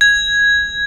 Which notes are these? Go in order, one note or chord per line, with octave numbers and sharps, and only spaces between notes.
G#6